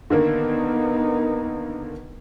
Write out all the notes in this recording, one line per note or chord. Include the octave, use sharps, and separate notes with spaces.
D3 D#3 A#3 B3 D#4